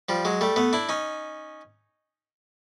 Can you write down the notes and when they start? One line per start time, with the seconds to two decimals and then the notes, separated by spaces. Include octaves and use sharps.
0.09 F3 G3
0.25 F#3 G#3
0.41 G3 A3
0.56 A3 B3
0.73 D4 E4
0.89 C#4 D#4